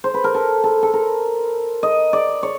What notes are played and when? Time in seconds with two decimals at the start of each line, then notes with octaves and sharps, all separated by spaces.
0.04 C5
0.14 B4
0.24 A#4
0.34 A4
0.64 A4
0.83 A4
0.93 A#4
1.83 D#5
2.13 D5
2.43 C#5